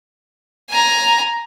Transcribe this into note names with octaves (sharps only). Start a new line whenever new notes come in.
G#5 A#5